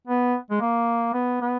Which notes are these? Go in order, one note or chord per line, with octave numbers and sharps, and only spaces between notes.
B3
G#3
A#3
B3
B3